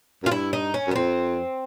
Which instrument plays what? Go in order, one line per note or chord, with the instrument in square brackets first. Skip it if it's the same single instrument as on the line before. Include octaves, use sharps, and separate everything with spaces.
[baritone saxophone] F#2
[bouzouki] F4
[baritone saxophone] G2 [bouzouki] E4
[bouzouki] D#4
C#4
[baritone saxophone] F#2
[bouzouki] B3
[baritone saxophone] F2 [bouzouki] C4